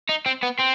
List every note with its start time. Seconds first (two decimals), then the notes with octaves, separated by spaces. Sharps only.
0.09 D#4
0.26 C4
0.43 B3
0.59 C4